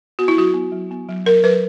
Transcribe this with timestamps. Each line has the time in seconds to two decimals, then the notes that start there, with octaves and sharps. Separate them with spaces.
0.19 B3 F#4
0.28 E4
0.37 F#3 F#4
0.54 B3
0.72 F#3
0.91 B3
1.09 F#3
1.26 F#3 A#4
1.43 F#3 B4